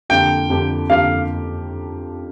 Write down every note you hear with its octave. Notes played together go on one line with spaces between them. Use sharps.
F2 D3 A#3 G4 G5
F2 D3 A#3 G4
F2 D3 A#3 G4 F5